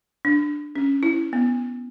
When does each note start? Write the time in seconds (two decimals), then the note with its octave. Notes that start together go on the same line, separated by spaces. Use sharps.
0.25 D4
0.75 C#4
1.03 E4
1.33 B3